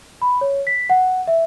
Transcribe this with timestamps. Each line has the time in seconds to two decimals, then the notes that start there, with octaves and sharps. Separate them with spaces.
0.22 B5
0.41 C#5
0.67 B6
0.90 F#5
1.27 E5